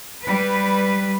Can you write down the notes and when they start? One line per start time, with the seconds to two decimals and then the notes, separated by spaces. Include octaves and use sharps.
0.22 G3 B4